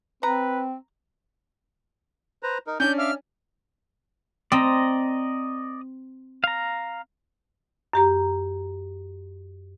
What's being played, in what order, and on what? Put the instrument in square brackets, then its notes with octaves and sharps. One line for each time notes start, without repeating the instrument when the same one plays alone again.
[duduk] C4 [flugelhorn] B4 [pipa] A#5
[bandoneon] B4 C5 A#5
D#4 A#4
[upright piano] C#4 D4 [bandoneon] D5 [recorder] G6
[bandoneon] E5 F5 D6 [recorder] F6
[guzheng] C4 [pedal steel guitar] D5 D#5 A#5
[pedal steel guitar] F5 A#5
[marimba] F#2 G4 A#5